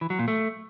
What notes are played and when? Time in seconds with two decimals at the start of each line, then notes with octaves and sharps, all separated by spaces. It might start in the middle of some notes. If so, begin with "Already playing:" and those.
0.01 E3
0.10 F#3
0.19 A#2
0.28 A3